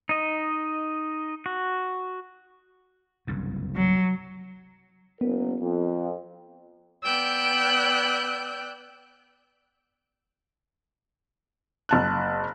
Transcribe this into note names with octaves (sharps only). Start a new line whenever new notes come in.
D#4 D#5
F#4
F#1 C2 G2
F#3
F#1 B3 A#4
F2
B3 D5 G5 E6 F#6 G6
F#1 A5 F#6